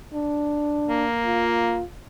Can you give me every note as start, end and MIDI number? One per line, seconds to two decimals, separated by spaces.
0.14 1.06 62
0.88 1.78 58
1.25 1.83 65